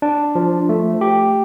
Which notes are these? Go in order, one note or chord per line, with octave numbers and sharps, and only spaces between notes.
D4
F3
A3
G4